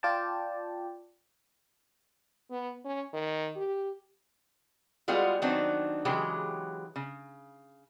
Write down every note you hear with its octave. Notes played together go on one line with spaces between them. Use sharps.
F4 D5 G5 A5
B3
C#4
D#3
G4
G3 G#3 B3 F4 F#4 G#4
D#3 F#3 B3 C4 D4 D#4
C#3 E3 F#3 G#3 G4
C#3